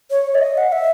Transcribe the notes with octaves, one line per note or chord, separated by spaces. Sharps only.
C#5
E5
D#5
F#5
E5